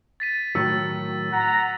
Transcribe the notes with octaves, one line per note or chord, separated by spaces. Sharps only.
A6 B6 D#7
A2 D#3 F#3 E6 A6
F#5 A#5